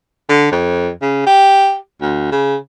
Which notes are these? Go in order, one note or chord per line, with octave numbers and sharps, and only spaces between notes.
D3
F2
C#3
G4
D2
C#3